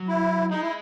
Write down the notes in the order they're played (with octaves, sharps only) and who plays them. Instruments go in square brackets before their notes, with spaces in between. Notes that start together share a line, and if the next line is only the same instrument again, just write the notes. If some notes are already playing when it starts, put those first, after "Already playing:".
Already playing: [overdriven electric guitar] F#3
[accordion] E4
[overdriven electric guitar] G#3 [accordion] D#4
[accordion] E4